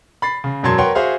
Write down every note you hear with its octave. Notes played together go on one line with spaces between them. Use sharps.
B5 A6 C7
C#3
E1 F#2 F#3 A5 C6 G#6
A#4 B4 C#5 F#5 G5 C6
F#4 G#4 C5 E5 F5